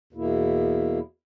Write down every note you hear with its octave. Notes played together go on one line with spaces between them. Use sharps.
E2 B2 A#3 E4